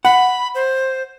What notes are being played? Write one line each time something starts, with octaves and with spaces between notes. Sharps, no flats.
F#5 B5
C5